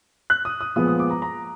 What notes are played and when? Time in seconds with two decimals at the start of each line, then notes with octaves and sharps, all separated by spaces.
0.30 F#6
0.45 D#6
0.61 D#6
0.76 A#2 F3 G#3 B3 D#6
0.87 D#6
0.99 D6
1.11 A#5
1.22 A#5